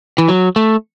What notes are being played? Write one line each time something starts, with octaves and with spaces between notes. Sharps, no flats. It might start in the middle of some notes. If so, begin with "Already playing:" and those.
E3
F#3
A3